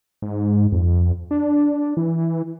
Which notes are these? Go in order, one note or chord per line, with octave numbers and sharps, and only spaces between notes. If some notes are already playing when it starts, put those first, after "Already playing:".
G#2
F2
D4
E3